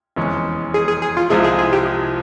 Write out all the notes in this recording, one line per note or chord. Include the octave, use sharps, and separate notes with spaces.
F1 E2 E3 G#3 C#4
G#4
G#4
G#4
F4
C2 C3 F3 G#3 E4 G#4
G#4
G#4
G4